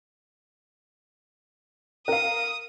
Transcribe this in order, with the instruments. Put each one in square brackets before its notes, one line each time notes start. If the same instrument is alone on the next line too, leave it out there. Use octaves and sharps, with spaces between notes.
[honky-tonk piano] A#4 F5 [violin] D#6